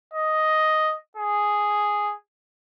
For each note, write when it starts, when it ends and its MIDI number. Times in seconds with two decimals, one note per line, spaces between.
0.14 0.96 75
1.17 2.14 68